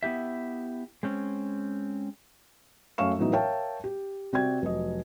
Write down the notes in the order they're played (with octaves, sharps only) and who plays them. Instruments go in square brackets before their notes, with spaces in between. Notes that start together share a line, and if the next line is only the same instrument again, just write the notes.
[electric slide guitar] B3 E4 G4 E5
G#3 C4 C#4
[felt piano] F#2 A3 C#4 F5 C#6 E7
A2 E3 F#3 B3 D#4
A#4 C#5 E5 F5 G5 A5
G4
C3 C4 F#4 D5 G5 G#6
F1 F#3 D#5